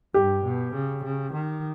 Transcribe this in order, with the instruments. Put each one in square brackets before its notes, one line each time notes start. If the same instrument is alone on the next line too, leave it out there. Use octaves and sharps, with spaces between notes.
[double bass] G2 [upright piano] G4
[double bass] B2
C#3
C#3
D#3